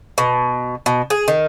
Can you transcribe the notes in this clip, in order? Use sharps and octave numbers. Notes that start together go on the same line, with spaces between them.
B2
B2
G#4
D#3